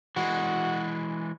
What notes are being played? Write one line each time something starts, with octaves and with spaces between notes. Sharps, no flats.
E3 G#3 F#4